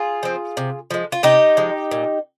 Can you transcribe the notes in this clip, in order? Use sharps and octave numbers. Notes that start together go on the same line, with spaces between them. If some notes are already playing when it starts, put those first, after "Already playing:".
Already playing: F4 G#4
F3 C4
C3
F3 G#3
F4
C3 D#4 G4
F3 G#3
A#2